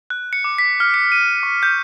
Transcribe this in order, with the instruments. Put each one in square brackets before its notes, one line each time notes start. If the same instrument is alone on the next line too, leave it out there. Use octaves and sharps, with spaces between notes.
[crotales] F#6
C#7
D6
B6
F6
C#7
D#7
C#6
G6